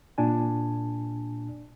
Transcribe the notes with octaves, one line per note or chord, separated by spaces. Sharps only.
A#2 D4 G#5